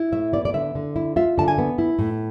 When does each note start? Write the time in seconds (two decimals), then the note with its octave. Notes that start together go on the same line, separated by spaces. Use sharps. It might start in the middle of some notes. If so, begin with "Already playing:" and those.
Already playing: E4
0.12 A2 E5
0.33 B3 D5
0.45 D5
0.54 D3 E5
0.75 D3
0.96 E4
1.16 F4 E5
1.38 D3 A5
1.48 G#5
1.58 B3
1.78 E4
1.99 A2